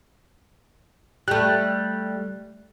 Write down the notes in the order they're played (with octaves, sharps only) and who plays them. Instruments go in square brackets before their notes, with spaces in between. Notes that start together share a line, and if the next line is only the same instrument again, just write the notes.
[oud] G3 A3 [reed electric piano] F#6